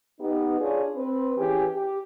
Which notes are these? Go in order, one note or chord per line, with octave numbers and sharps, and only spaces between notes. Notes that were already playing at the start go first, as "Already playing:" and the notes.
B3 D#4 G4
D4 F4 G#4 C#5 D5
C4 B4
E3 C#4 G4 G#4
G4